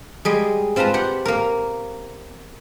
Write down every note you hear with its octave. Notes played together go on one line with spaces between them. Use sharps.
G3 G#3 D#5
C4 F4 B4 A5 A#5
G4 F#5
A#3 A#4